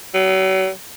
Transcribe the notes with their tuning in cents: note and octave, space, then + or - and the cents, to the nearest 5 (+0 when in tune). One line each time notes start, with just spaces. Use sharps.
F#3 +40